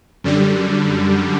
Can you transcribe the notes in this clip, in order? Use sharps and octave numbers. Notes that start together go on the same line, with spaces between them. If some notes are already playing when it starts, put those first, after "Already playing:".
F#2 D3 G3